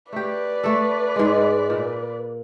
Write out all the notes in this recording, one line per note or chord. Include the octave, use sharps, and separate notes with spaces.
A3 G4 B4 D5
A3 A4
G#2 G#3
A#2